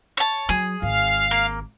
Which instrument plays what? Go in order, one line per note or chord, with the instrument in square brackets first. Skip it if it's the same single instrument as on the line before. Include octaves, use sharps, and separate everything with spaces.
[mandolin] C#5 A5
[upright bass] F#3 [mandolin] G#4
[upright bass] G#1 D#3 [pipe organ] F5
[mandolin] A#3